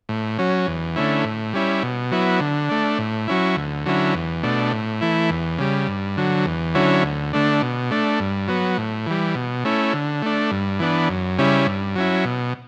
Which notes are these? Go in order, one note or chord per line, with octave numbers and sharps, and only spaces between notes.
A2
F#3 C#4
E2
D3 A3 C#4 E4
A2
G3 C#4 E4
B2
F#3 B3 E4
D3
A3 D4
A2
F#3 C#4 E4
D2
D3 F#3 C#4 E4
E2
B2 A3 D4
A2
E3 A3 E4
E2
C#3 G3
G2
D3 F#3
E2
D3 F#3 C#4 E4
D2
D3 A3 D4
B2
A3 D4
G2
F#3 B3
A2
E3 G3
B2
A3 C#4 E4
D3
A3 D4
G2
E3 B3 D4
F#2
C#3 G3 C#4 E4
G2
F#3 C#4 E4
B2